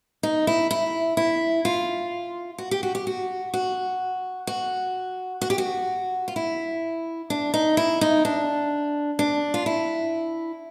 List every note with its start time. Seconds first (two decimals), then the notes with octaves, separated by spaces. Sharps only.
0.23 D#4
0.47 E4
0.71 E4
1.17 E4
1.65 F4
2.58 F#4
2.71 G4
2.83 F#4
2.95 G4
3.07 F#4
3.54 F#4
4.47 F#4
5.41 F#4
5.50 G4
5.58 F#4
6.28 F4
6.36 E4
7.30 D4
7.54 D#4
7.77 E4
8.01 D#4
8.25 D4
9.19 D4
9.54 F4
9.66 E4